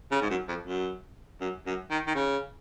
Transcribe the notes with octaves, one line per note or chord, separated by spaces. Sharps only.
C#3
G#2
F#2
F2
F#2
F#2
F#2
D#3
D#3
C#3